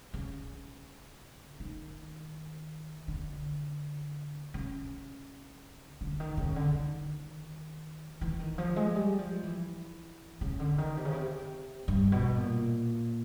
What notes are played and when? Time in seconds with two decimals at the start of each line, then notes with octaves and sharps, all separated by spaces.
0.14 C#3
1.60 D#3
3.08 D3
4.54 C#3
6.01 D3
6.20 D#3
6.37 C#3
6.56 D3
6.74 D#3
8.21 E3
8.39 D#3
8.58 F3
8.76 G#3
8.95 G3
9.19 F3
9.43 E3
10.41 C#3
10.59 D3
10.78 D#3
10.97 C3
11.05 C#3
11.13 C3
11.88 G2
12.12 B2
12.37 A#2